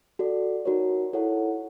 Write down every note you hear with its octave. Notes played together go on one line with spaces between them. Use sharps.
F#4 A4 D5
D#4 F#4 A#4 C#5
E4 A4 C#5 F#5